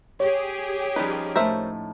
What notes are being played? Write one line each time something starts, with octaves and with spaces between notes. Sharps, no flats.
G4 G#4 C#5
F3 G3 C#4 D#4 B4
A2 A3 A#4 C5 E5